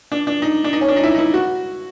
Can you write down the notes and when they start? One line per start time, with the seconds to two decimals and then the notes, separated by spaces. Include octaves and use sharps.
0.12 D4
0.27 D4
0.42 D#4
0.64 D4
0.73 D#4
0.81 C#4
0.88 D4
0.96 D#4
1.03 E4
1.14 D#4
1.19 E4
1.34 F#4